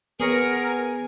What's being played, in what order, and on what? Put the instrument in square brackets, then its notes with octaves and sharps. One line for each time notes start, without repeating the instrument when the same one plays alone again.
[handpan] B3 [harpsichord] G#4 C#5 [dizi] A#4 [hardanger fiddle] G#5